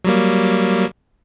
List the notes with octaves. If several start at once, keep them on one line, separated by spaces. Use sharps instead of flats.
F#3 G3 A#3